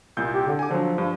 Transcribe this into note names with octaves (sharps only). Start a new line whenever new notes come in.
C2 A#2 G6
G4
D3
G#5 D6
D3 F3 F#3
G2